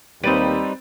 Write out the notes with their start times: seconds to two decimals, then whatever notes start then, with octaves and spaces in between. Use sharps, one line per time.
0.24 D#2 G3 C4 D#4 B4 C5 A6 D7